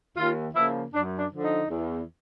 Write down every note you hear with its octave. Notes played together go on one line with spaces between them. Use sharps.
D#2 F4
C#3 F3 A#3 E4
F#2 D4
D4
D3 F3
D#4
E2